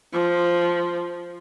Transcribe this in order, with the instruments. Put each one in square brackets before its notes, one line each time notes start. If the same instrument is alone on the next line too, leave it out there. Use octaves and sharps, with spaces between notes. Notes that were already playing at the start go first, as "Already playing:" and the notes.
[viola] F3